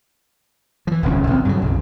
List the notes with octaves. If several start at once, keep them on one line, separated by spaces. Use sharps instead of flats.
E3 F3
D1 G1 C2 C#4
A#1 E2 G#3 C4
G2 C#3 F#3
B1 F2